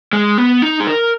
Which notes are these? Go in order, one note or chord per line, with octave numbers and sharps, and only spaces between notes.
G#3
B3
D#4
G#4
A#4